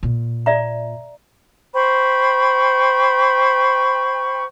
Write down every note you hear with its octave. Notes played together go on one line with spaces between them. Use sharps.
A#2
D5 E5 A#5
C5 G5 B5 C#6